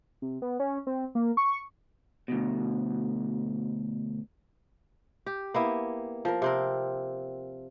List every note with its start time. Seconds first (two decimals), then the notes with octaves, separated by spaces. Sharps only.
0.22 C3
0.42 B3
0.60 C#4
0.87 C4
1.15 A#3
1.37 C#6
2.28 D2 B2
5.26 G4
5.54 A#3 B3 E4
6.25 F3 A#4
6.42 C3 C4 A#4